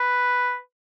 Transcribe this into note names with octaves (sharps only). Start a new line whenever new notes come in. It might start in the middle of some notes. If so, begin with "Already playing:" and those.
Already playing: B4